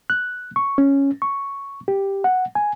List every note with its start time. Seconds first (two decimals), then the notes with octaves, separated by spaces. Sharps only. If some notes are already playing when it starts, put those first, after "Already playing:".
0.10 F#6
0.56 C#6
0.78 C#4
1.22 C#6
1.88 G4
2.24 F#5
2.55 G#5